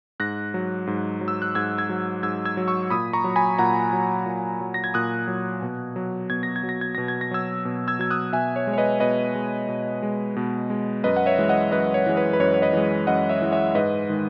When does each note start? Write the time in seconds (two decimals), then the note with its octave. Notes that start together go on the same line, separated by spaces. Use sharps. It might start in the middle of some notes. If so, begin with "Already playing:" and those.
0.20 G#2 F#6 A#6
0.54 F#3
0.87 G#2
1.21 F#3
1.28 E6
1.42 F#6
1.55 G#2 E6 G#6
1.78 E6 G#6
1.89 F#3
2.23 G#2 E6 G#6
2.45 E6 G#6
2.57 F#3
2.68 C#6 E6
2.90 A#2 B5 D#6
3.13 A#5 C#6
3.24 F#3
3.36 G#5 B5
3.59 A#2 F#5 A#5
3.93 F#3
4.26 A#2
4.61 F#3
4.74 A#6
4.84 G#6
4.94 A#2 D#6 F#6
5.28 F#3
5.62 B2
5.96 F#3
6.30 B2 G#6
6.43 A#6
6.56 G#6
6.63 F#3
6.69 A#6
6.81 G#6
6.95 B2 A#6
7.08 G#6
7.21 A#6
7.31 F#3 E6 G#6
7.65 B2
7.88 E6 G#6
7.99 F#3 G#6
8.10 D#6 F#6
8.33 B2 E5 G#5
8.56 C#5
8.67 G#3
8.73 C#5
8.78 B4 D#5
9.00 B2 B4 D#5
9.35 G#3
9.69 B2
10.03 G#3
10.36 B2
10.70 G#3
11.04 F#2 B4 D#5
11.16 F#5
11.26 C#5 E5
11.38 E3 G#3
11.49 D#5 F#5
11.71 F#2 B4 D#5
11.94 C#5
12.06 E3 G#3
12.17 B4
12.33 B4
12.40 F#2 C#5
12.54 C#5
12.62 B4 D#5
12.73 E3 G#3
13.07 F#2 D#5 F#5
13.29 C#5 E5
13.42 E3 G#3
13.52 C#5 E5
13.75 G#2 B4 D#5
14.10 D#3 G#3